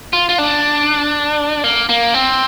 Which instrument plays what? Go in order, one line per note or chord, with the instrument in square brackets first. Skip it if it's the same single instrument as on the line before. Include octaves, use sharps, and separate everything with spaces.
[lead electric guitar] F4
F4
D4
A#3
A#3
C4